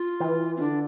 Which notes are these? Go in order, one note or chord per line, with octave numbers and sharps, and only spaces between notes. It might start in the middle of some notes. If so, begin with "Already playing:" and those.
Already playing: F4
E3
C4
D3 D4